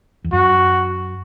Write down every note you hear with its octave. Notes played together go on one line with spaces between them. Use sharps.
E2
F#2 F#4